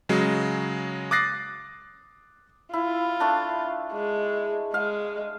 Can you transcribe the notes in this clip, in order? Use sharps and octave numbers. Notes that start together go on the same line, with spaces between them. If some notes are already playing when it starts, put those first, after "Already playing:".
C#3 F#3 G#3
D6 D#6 F#6 A6 A#6 C7
E4 F4
A3 D4 A5
G#3
G#3 F5